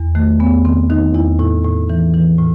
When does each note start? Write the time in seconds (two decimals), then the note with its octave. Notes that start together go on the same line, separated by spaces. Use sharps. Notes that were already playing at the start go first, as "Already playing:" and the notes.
Already playing: E2
0.15 D#3 A3
0.40 E2 B3
0.65 D#3 C4
0.90 D#3 D#4
1.14 E2 E4
1.39 A2 E4
1.64 A2
1.90 E3
2.14 E3
2.38 A2